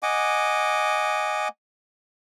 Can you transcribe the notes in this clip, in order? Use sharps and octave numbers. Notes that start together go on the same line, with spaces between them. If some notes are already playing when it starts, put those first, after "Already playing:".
D#5 F#5 G#5 D6